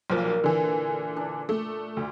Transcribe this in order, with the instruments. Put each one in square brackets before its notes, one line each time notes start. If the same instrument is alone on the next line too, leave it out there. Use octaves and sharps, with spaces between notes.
[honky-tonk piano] B1 F3 A#3 [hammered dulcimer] A#2
[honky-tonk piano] D3 E3
[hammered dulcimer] D4
[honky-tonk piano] A3
D2